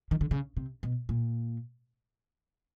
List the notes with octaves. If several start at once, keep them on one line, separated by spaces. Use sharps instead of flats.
D#3
D3
C#3
C3
B2
A#2